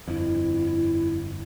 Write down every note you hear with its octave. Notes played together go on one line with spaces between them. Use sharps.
G1 F2 E4